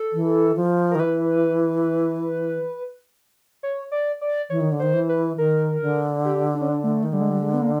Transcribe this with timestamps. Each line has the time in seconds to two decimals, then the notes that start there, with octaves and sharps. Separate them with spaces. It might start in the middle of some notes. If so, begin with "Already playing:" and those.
Already playing: A4
0.13 E3
0.56 F3
0.91 A#4
0.95 D#3
0.99 E3 B4
3.63 C#5
3.92 D5
4.21 D5
4.50 E3 C#5
4.61 D#3
4.72 D3
4.79 D#3 C5
4.94 E3
5.09 B4
5.38 D#3 A#4
5.82 D3
6.25 G4
6.55 D4
6.61 C#4
6.69 D4
6.84 A3
7.03 D#3
7.13 D3 G3
7.21 G#3
7.30 G3
7.42 G#3
7.54 B3
7.62 A#3